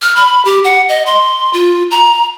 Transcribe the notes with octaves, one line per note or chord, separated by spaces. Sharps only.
F6
B5
G4
F#5
D#5
C6
F4
A#5